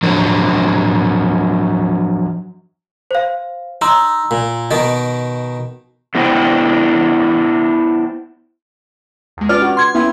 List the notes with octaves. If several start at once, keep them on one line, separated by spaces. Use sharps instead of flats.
F3 F#3 D4 A#4
C5 F5
D#4 A#5 C6 E6
A#2
B2 D#3 D#4 D#5
A3 B3 D4 E4 C5 G5
E2 G#3
C#4 F4 B4 D5 F6
F#4
C6 G#6
B3 C#4 E4 G5